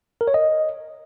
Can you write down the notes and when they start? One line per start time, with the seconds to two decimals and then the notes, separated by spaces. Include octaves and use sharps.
0.21 A#4
0.28 C#5
0.34 D#5